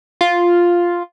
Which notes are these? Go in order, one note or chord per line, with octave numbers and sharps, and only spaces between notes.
F4